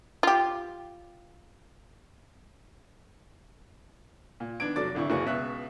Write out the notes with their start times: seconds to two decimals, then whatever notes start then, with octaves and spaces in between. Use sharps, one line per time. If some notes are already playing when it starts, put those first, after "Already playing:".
0.23 F4 G4
4.40 A#2
4.60 D#3 B3 D4 G#6 D7
4.76 F1 F#3 A4 D5 D6 A6
4.95 G#1 D2 E4 C#6
5.10 F#1 E3 F#3 A#3 C#6
5.26 C#2 B2 E5 C#6 F#6